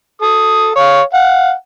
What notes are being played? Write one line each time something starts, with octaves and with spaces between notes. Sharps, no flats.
A4 D#6
C#5 F5
F5 F#5